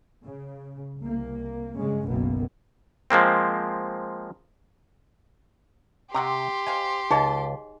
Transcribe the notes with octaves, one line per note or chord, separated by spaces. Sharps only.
C#3
C2 A#3
G2 C#3 G#3 C#4
F#1 B1 B2 A#3 B3
F3 G#3 A#3 C4
C3 F#4 G4 G5 A#5 C6
C5 D#5 F5 G#5
C#2 A#3 D#4 G#4 D#5 A5